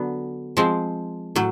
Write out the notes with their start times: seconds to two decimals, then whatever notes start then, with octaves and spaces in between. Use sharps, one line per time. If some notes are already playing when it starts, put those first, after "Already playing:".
Already playing: D3 F#3 B3
0.57 F3 G#3 C4
1.36 A2 F#3